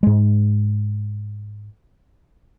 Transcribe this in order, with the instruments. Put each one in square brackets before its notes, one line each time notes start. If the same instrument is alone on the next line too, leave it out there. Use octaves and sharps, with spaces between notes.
[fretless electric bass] G#2 G#3